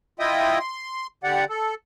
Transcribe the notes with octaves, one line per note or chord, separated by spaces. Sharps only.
E4 F4 D#5 E5 G5 D#6
C6
D3 G4 D5 F#5
A4